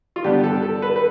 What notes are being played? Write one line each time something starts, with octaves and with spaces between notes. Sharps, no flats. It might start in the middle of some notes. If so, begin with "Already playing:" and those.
F4
G2 D3 G3 B3 G4
A4
A4
B4
B4